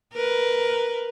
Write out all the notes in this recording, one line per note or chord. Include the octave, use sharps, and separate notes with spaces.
A#4 B4